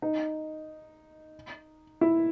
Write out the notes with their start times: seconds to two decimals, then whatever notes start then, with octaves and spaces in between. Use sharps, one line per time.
0.02 D#4
2.01 E4